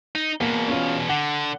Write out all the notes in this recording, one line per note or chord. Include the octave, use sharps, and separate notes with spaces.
D#4
E2 B2 A#3
C#4 F4
D3 F#5